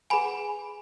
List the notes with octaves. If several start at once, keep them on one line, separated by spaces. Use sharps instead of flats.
G#4 B4 F#5 G#5 B5